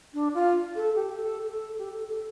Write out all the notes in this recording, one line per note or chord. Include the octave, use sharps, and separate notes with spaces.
D4
F4
A4
G4
A4
A4
G4
A4
A4